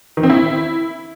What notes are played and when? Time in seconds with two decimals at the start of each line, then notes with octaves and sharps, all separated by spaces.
0.17 D#3
0.23 C4
0.30 E4